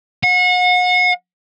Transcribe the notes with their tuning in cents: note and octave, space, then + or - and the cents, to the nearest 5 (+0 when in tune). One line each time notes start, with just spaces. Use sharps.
F#5 -35